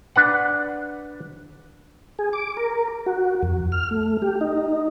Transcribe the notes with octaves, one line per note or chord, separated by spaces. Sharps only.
D4 B4 F#5
G#4
D6
A#4
F#4
F2
F6
A3
G4
D#4